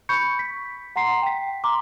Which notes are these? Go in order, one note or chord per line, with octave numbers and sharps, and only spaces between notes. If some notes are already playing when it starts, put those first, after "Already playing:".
B5 C#6 G6 C#7
B6
F#5 A#5 C6 C7
G5 B6
A#5 C6 D6